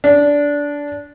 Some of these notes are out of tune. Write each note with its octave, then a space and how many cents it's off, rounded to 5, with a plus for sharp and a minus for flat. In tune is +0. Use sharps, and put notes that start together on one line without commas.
D4 -15